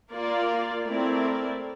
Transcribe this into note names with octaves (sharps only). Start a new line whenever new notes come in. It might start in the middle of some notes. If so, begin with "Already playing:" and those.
A#3 F4 A#4 D5
A3 C4 E4 A#4 D5